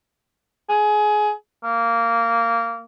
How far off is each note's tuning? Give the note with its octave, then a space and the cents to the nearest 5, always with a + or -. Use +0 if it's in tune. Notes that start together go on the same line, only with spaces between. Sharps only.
G#4 +20
A#3 -15